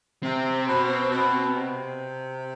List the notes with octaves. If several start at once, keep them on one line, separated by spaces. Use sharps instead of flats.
C3 C4
B2
B2
C3